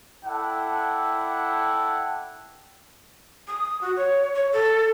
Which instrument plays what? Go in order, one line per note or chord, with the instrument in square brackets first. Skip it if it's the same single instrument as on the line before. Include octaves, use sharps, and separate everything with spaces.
[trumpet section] E4 A4 D5 F#5 G5
[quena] D#6
F#4
C#5
C#5
A4